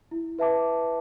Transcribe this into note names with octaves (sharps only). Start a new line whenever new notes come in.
E4
B4 E5 A5 D6